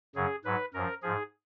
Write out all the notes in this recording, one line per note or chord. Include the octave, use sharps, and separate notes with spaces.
F#2 C#3 F#3 G#4
G#2 F#3 B4
F#2 F3 A#4
G#2 F3 G#4